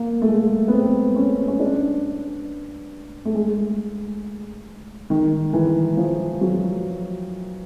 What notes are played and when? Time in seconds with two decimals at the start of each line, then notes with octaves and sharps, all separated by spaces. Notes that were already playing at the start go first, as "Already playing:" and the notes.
Already playing: A#3
0.22 A3
0.28 G#3
0.68 B3
0.72 C4
1.16 C#4
1.48 C#4
1.60 D4
3.25 A3
3.35 G#3
5.10 D#3
5.53 E3
5.97 F3
6.41 F#3